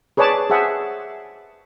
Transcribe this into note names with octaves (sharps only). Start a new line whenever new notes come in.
G#4 B4 C#5 D5 A5
G#4 C5 E5 F#5 A5